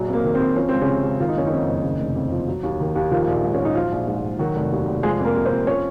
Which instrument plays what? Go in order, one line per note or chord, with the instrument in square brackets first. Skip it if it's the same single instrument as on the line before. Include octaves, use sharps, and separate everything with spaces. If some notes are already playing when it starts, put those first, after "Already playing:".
Already playing: [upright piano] A#1 F#3
F2
A#3
D#3
C4
F2
F3 C#4
C#2 C4
C#3 C#4
C3
C#2
D#3 F4
D#4
F#1 C#4
D#3 D#4
F2
F#1
C#3
F1
F2
F3
F#3
D#2
D#3
D#2
D#3 F3 F4
A#1
G#2
C#4
A#1
D#4
F3 F#3 F4
A#1
G#2
A#1
D#3 F#3 F#4
F1
D#2
F1
F3 G#3 G#4
F2
A#3 A#4
C3
C4 C5
F2
F3 C#4 C#5